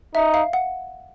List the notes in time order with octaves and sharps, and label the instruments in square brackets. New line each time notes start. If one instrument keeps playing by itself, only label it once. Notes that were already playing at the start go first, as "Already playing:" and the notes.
[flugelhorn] D#4 [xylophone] E5
[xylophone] F5
F#5